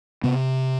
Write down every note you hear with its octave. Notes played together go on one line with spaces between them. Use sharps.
C3 B3